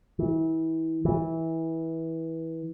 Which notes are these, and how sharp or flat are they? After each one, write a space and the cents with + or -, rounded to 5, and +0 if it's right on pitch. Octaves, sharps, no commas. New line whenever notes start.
E3 -30
E3 -20